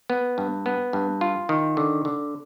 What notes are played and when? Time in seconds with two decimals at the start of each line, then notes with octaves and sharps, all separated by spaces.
0.10 B3
0.38 G2
0.66 B3
0.93 G2
1.21 F4
1.49 D#3
1.77 D3
2.05 D3